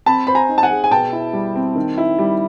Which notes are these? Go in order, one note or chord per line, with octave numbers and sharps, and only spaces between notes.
C4 A5 B5
C5 B5
G#5 A#5
D#4
A5
F#5 G#5
G#4
G#5
B2 G5 A5
E4
G3
C4
D#3
E4
G3